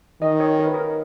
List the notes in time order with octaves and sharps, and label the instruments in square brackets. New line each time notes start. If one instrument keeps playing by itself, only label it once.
[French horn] D#3 [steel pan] D#5
[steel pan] C#5
A#4
B4
A#4